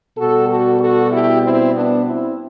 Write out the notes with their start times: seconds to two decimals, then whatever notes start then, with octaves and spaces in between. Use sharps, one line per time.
0.17 B2 G3 F#4 A4
0.49 F#4 A4
0.80 F#4 A4
1.11 E4 G4
1.42 C4 E4
1.74 B3 D4
2.05 C4 E4